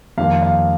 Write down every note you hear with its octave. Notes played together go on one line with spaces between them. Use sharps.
F2 D#3 G3 A#3 F5
F5